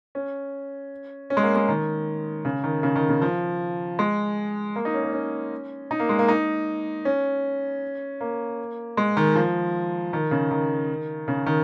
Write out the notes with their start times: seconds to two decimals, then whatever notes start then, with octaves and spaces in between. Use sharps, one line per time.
0.15 C#4
1.30 C#4
1.37 G#3
1.43 A#3
1.56 G#3
1.69 D#3
2.45 C#3
2.64 D#3
2.83 C#3
2.96 D#3
3.09 C#3
3.22 F3
3.99 G#3
4.76 A#3
4.85 D#4
4.94 C#4
5.04 A#3
5.13 C#4
5.91 D#4
6.00 A#3
6.09 G#3
6.19 A#3
6.28 D#4
7.05 C#4
8.21 A#3
8.97 G#3
9.17 D#3
9.35 F3
10.13 D#3
10.31 C#3
10.51 D#3
11.28 C#3
11.46 D#3